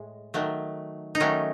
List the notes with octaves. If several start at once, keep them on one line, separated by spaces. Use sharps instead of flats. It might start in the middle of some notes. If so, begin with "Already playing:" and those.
Already playing: A2 G#3
D#3 F#3 A3
D#4
D#3 F#3 A3 C#4